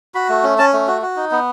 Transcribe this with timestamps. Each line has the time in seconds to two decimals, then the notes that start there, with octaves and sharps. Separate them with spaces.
0.15 F#4 B5
0.29 A3
0.44 C#4
0.58 C#4 A5
0.73 A3
0.88 F#4
1.02 F#4
1.16 D#4
1.31 B3